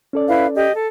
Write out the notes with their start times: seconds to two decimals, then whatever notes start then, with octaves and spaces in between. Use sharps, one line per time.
0.13 C#4 A4 D5
0.28 E4 B4 F5
0.56 G4 D#5
0.74 A4